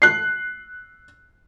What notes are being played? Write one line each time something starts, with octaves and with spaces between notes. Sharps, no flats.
F#6 C7